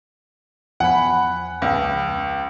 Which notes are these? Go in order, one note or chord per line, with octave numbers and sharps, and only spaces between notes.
E2 F3 F#5 G#5 B5
C#2